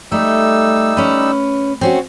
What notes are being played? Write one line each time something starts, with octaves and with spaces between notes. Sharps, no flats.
G3 A3 D#4 E6
C#4 B4
C4 C#4 F#4